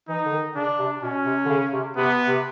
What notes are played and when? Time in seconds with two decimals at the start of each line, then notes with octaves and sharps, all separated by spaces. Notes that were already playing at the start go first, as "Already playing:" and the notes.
0.08 E3 D#4
0.26 D3
0.32 D#3
0.55 C#3 D4
0.79 C3
1.02 B2 C#4
1.26 C3
1.45 D3
1.49 C#3
1.73 C3
1.96 C3 B3
2.28 C3